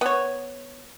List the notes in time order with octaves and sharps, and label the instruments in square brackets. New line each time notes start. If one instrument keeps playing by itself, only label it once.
[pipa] B3 C#5